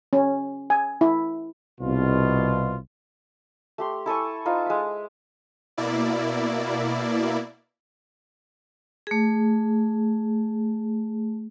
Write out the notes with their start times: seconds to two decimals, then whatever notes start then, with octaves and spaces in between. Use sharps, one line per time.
0.13 C#4
0.70 G#5
1.01 E4
1.81 C2 B2 F4
3.78 A3 G4 C6
4.06 E4 A4 G#5 C#6
4.46 D#4 F4 C5
4.66 G#3 E5
5.77 B2 A#3 E4 D5
9.07 A3 G#4